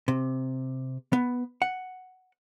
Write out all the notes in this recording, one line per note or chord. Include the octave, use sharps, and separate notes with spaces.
C3
B3
F#5